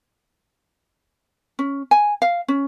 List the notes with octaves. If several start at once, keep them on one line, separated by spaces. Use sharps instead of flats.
C#4
G#5
F5
C#4